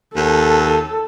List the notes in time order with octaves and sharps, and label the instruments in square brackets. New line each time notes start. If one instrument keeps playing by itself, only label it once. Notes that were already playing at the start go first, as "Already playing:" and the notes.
[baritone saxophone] D#2 [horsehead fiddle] A4